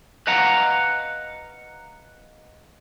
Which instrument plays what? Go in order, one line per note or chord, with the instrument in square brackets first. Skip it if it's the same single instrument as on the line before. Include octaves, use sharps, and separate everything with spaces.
[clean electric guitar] B4 D#5 F5 F#5 A#5